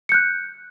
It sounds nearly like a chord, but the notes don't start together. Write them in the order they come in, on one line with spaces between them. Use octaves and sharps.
C#7 G6 F#6